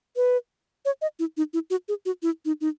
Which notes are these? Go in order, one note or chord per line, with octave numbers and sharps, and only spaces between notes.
B4
C#5
D#5
E4
D#4
E4
F#4
G#4
F#4
E4
D#4
D#4